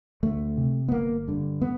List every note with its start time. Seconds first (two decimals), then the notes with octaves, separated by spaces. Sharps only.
0.23 D2 A3
0.57 C3
0.88 B3
0.92 G1 A#3
1.28 G2 D3
1.61 B3